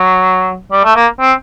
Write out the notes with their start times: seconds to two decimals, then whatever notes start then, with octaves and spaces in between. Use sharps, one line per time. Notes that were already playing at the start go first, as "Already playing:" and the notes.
Already playing: F#3
0.72 G3
0.84 A3
0.96 A#3
1.20 C4